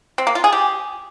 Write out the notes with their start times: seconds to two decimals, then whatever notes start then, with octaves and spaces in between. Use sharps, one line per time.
0.18 C4
0.27 A#3
0.35 F4
0.44 G#4
0.52 G4